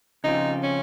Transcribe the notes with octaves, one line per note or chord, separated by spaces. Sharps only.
C#3 F3 C4 D#4 F4
C#4